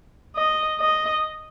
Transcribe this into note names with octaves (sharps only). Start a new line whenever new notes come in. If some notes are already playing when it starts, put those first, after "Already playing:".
D#5
D#5